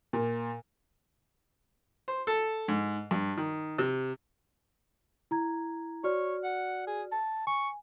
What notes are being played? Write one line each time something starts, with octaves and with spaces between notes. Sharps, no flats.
A#2
C5
A4
G#2
G2
D#3
C3
E4 A#5 G#6
F#4 C#5 D5 F6
F#5
G#4
A5
G#5 C#6